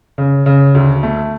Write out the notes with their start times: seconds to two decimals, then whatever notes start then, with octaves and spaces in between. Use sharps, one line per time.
0.18 C#3
0.46 C#3
0.75 D2
1.03 A3